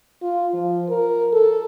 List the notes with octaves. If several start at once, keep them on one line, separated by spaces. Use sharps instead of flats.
F4
F3
A#4
A4